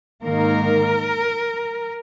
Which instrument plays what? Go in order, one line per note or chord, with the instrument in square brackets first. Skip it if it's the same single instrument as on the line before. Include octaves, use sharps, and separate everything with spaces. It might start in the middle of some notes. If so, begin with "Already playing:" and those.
[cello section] G#2 D#3 A#3 A#4